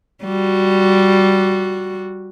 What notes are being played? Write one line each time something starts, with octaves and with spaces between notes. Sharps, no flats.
G3 F#4